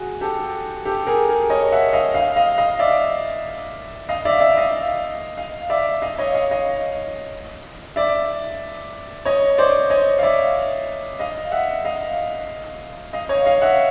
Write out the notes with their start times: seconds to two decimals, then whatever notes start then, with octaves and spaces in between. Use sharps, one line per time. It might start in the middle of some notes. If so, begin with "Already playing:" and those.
Already playing: F#4 G#4
0.21 G4 A4
0.85 G4 A4
1.07 G#4 A#4
1.29 G#4 A#4
1.50 C#5 D#5
1.72 E5 F#5
1.93 D#5 F5
2.14 D#5 F5
2.36 D#5 F5
2.58 D#5 F5
2.79 D5 E5
4.09 D#5 F5
4.25 D5 E5
4.41 D5 E5
4.57 D#5 F5
5.37 D#5 F5
5.70 D5 E5
6.02 D#5 F5
6.19 C#5 D#5
6.34 D#5 F5
6.51 D#5 F5
7.96 D5 E5
9.25 C#5 D#5
9.58 C5 D5
9.90 C#5 D#5
10.19 F5
10.23 D5 E5
11.19 D#5 F5
11.52 E5 F#5
11.85 D#5 F5
13.13 D#5 F5
13.29 C#5 D#5
13.45 D#5 F5
13.62 E5 F#5